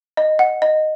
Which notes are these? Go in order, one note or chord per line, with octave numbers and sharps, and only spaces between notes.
D#5
F#5
D#5